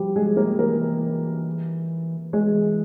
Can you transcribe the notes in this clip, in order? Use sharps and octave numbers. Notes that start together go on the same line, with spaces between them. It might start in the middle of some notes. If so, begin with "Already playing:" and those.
Already playing: F3 G3 G4
G#3 G#4
A#3 A#4
E3 A#3 A#4
E3 G#3 G#4